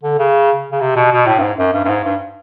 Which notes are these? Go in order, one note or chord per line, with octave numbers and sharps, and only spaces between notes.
D3
C#3
C#3
C3
B2
B2
A2
G2
G#2
F#2
G2
G2
G#2
G2